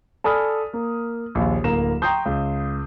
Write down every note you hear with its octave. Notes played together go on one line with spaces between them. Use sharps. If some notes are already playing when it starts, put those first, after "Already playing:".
A4 D5 G#5 B5 D#6 F6
A#3
A#1 D#2
D1 A#3 A#5 E7
G5 A#5 C6 C#6 D#6 G6
C#2